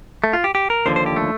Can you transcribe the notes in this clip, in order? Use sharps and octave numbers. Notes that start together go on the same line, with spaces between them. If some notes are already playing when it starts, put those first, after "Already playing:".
A3
F4
G4
G4
A#4
D#2 D3 F3 C5
C5
G4
A3